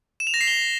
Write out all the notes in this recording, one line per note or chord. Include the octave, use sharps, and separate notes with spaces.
E7
F7
A#6
C7
G7